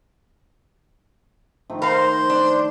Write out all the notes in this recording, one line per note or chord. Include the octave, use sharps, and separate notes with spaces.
D#3 F3 A3
A#4 C5 F5
D4